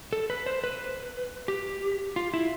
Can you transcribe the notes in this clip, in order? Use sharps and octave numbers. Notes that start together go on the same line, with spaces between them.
A4
B4
C5
B4
G4
F4
E4